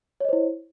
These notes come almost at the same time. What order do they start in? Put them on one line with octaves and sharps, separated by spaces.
C#5 D#5 C5 E4